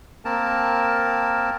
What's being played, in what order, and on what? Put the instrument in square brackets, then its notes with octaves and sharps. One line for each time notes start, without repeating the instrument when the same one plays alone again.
[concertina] A#3 C4 A#4 A5